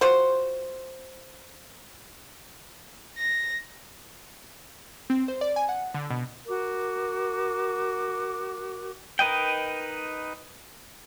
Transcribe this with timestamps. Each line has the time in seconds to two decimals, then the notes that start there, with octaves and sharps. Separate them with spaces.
0.01 F4 F#4 C5
3.18 A#6
5.10 C4
5.28 C5
5.41 D5
5.56 G#5
5.69 F#5
5.94 D3
6.10 B2
6.48 F#4 A#4 D6
9.19 D#4 A#4 B4 D#5 G5